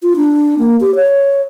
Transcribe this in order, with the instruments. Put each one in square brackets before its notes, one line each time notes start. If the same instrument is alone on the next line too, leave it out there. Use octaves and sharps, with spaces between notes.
[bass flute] F4
D4
A#3
G4
C#5